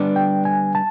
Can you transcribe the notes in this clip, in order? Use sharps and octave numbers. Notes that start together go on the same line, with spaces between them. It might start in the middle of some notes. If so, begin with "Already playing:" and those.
Already playing: D3 G3 B3 D4
G5
G#5
A5